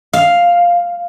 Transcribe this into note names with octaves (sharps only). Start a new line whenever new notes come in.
F5